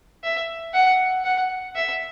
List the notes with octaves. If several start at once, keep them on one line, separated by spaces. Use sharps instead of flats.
E5
F#5
F#5
E5